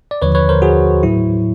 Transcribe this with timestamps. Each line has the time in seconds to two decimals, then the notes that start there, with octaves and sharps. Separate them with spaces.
0.11 D5
0.22 D#2 D3 F3 B4 C#5
0.35 B4 C#5
0.49 A#4 C5
0.62 F#4 G#4
1.03 A2 F#3 E4